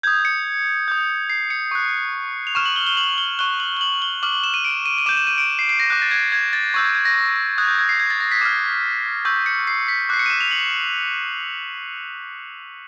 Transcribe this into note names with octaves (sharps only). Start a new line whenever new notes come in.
D#6 G6 G#6
C#7
D#6 G6
C7
C#7
C#6 F#6
F7
C#6 F6 E7
F#7
G7
G7
F#7
G7
C#6 F#6 G7
F#7
G7
F#7
G7
D6 F6 F#7
F#7
E7
D#7
D7
D#7
D#7
D6 G6 E7
E7
D#7
D7
C7
C7
A#6
D6 F#6 G6
A6
G#6
G#6
A6
C#6 E6 G6 G#6
G#6
G#6
A#6
D#6 F#6 G#6
G6
G#6
C7
G#6
A6
A#6
B6
D6 F6
C#6 E6 G6
C#7
C7
B6
D6 F#6 C7
C#7
D#7
E7
F7
F#7